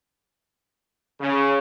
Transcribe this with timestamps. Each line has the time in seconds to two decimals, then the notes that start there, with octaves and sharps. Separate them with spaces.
1.20 C#3